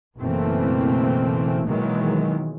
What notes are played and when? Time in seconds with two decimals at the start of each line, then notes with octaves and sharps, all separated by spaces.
0.19 F#1 B2 E3 A3 A#3 C4
1.66 B2 D#3 E3 F#3 G#3 A#3